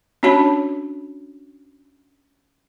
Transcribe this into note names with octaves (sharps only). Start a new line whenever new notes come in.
C#4 D4 F#4 C#5 A5 B5